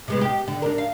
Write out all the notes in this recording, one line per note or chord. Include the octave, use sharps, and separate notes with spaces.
C3 G#3 B3
G4
D3
D4 A#4
F5